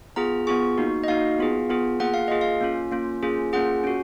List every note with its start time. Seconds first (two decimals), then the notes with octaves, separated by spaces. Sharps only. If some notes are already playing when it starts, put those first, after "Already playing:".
0.16 B3 F4 G#4 A#5
0.47 B3 F4 G#4 C#6
0.78 A#3 D#4 F#4
1.04 D#5
1.08 A#3 D#4 F#4 F5
1.39 B3 F4 G#4
1.70 B3 F4 G#4
2.00 A#3 F4 G#4 F#5
2.14 F5
2.28 A#3 F4 G#4 D#5
2.41 F5
2.61 A#3 C#4 F4
2.92 A#3 C#4 F4
3.23 A#3 C#4 F4 G#4
3.53 A#3 C#4 F4 G#4 F#5
3.84 C#4 F#4